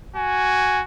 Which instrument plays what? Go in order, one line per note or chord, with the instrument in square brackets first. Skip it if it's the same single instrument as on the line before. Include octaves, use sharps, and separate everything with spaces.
[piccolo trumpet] F#4 [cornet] G#5